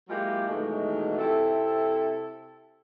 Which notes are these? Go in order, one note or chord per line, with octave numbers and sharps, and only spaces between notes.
F#3 G#3 A#3 E4 F4 G4
B2 D#3 E3 F#3 G#3 A3
C3 C4 E4 A4